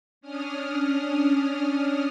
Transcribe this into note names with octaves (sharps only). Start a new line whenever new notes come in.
C#4 D4 D#6 F6